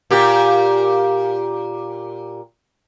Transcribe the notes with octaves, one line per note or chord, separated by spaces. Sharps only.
A#2 G4